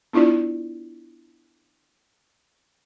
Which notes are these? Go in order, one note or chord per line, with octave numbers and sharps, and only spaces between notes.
B3 D4 E4 F4 D5